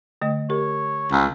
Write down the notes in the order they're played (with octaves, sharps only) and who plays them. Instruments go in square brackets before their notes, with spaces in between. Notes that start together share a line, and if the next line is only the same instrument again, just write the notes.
[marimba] D3 A3 D#5
[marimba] G4 A#4 [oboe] C#5
[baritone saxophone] C#2